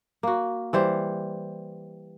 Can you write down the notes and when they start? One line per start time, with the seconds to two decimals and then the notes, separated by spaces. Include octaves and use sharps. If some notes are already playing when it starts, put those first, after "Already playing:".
0.23 A#3 F#4
0.73 E3 G3 C5